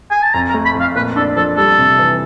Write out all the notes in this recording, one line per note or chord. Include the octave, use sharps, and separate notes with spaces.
G#5
A5
F2 A#5
A#5
A3
B5
F2
F5
A#2 B4
D4 A4
F3 A4
G3 A4
C3
E3